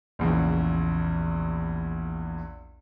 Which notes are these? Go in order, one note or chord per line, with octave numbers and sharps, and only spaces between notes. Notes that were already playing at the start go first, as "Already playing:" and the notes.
A#1 E2 C#3